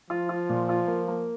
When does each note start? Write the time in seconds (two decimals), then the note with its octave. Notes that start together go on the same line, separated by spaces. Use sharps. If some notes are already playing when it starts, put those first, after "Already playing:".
0.10 F3 F4
0.29 F4
0.49 A#2
0.69 F4
0.87 A#3
1.08 A#3